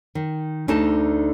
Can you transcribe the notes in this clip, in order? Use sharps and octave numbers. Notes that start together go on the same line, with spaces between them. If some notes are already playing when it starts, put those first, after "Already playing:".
D#3
D2 D3 D#4 A5